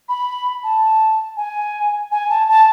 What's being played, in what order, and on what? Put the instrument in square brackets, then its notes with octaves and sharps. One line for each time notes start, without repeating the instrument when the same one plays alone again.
[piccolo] B5
A5
G#5
G#5
A5
A5